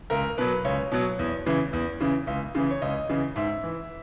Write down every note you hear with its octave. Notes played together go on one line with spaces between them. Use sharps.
C#2 A#4
B2 F#3 B4
C#2 C#5
B2 F#3
E2
C#3 E3
E2
C#3 E3
C#2
C#3 E3
C#5
C#2 D#5
C#3 E3
G#2 E5
E3